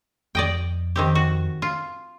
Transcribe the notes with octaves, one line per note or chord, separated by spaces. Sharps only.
F2 D5 D#5 G5
D#3 C4 G4
F#4
F4